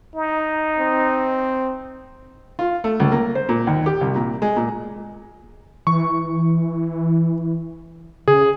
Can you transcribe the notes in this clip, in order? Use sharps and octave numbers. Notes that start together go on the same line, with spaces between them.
D#4
C4
F4
A3
C#2
A#3
C5
A#2
D#2
G4
C2
A#2
G#3
A#2
E3 C#6
C#3 G#4